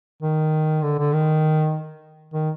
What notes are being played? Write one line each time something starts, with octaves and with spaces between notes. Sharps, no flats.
D#3
D3
D3
D#3
D#3